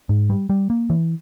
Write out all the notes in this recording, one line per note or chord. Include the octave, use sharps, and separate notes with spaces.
G#2
G3
G3
A#3
E3